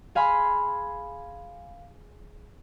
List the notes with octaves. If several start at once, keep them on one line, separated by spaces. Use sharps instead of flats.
G#4 F5 G#5 B5 C6